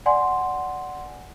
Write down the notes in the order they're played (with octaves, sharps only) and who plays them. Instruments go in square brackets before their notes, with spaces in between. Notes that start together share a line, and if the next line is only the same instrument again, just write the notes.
[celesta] D5 F#5 G#5 C6